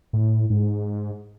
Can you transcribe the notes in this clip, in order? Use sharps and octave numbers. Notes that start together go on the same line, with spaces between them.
A2
G#2